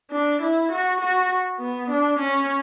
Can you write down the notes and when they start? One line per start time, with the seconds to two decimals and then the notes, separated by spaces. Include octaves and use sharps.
0.12 D4
0.42 E4
0.72 F#4
1.01 F#4
1.60 B3
1.90 D4
2.19 C#4